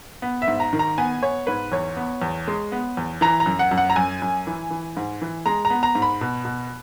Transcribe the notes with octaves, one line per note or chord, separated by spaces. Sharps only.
B3
E5
G#2
A#5
D#3
A#5
B3 G#5
B3 C#5
G#2 B4
E2 C#5
B3
E2
G#3
B3
E2
E3 A#5
A#5
F#2
F#5
F#2
F#5
A#5
F#2 G#5
F#2
E3
E3
G#2
E3
G#3 A#5
A#5
B3
A#5
G#2
B5
B2
B2